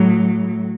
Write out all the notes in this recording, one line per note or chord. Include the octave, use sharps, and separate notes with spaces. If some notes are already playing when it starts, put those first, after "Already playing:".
Already playing: A2 F#3